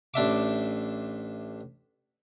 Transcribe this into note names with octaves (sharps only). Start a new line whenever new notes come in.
A1 D4 E5 D6